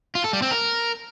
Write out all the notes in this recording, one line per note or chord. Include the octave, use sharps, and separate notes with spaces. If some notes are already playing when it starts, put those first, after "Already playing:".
F4
A4
G3
C4
A#4